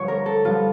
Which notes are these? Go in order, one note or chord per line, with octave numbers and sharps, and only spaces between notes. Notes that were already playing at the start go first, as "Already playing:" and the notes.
Already playing: G2 D3 F3 C#5
A#4
A4
G2 D3 F3 F4